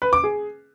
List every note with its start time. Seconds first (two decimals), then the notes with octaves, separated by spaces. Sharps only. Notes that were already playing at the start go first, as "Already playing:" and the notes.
0.02 B4
0.13 D6
0.24 G#4